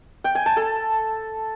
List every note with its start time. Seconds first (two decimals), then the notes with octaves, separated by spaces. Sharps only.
0.24 G5
0.35 G#5
0.46 A5
0.57 A4